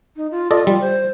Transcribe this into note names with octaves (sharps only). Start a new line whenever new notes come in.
D#4
F4
F4 A4 D5 D#5
G3 F4
C5